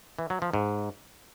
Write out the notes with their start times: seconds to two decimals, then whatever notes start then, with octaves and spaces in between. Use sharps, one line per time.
0.19 E3
0.30 F#3
0.42 F3
0.54 G#2